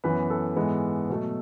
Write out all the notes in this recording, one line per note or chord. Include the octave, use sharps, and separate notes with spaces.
F#2 E3 B3 B4
A4
G#2 E3 G#3 B3
B2 F#3 A3